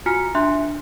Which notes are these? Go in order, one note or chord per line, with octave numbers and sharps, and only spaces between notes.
F4 F#4 G#5 A#5 F6 C#7
D4 E5 C6 F#6